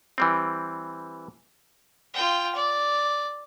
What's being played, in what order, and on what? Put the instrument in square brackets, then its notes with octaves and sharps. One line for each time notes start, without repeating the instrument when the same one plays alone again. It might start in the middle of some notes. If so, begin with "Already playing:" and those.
[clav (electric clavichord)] E3 G3 C4
[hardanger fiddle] F4 G5
D5